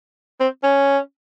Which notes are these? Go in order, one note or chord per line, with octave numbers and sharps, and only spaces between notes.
C4
C#4